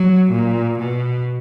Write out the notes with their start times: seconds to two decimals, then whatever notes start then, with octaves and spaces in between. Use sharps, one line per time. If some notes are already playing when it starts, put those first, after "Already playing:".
Already playing: F#3
0.31 A#2
0.79 B2